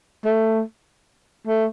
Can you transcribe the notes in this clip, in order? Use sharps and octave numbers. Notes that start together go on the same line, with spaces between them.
A3
A3